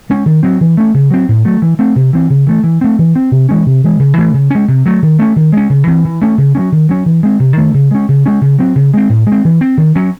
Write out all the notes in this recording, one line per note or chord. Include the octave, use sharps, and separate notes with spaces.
G#3 C#4
D#3
F#3 C4
E3
A3 C#4
C#3
F#3 C4
A2
F#3 A3
E3
A3 C4
C3
E3 C4
C#3
E3 A3
E3
A3 C4
E3
C4
C3
E3 G#3 C#4
C3
E3 G#3
C#3
E3 A3
C#3
G#3 C#4
C3
F#3 A3
D#3
A3 C#4
D#3
G#3 C#4
C#3
E3 C4
E3
A3 C#4
C#3
F#3 A3 C#4
D#3
F#3 C#4
E3
G#3 C4
C3
D#3 A3
C#3
G#3 C#4
C#3
G#3 C#4
C#3
F#3 C4
C#3
G#3 C4
A2
G#3
C4
E3
C4
D#3
F#3 C#4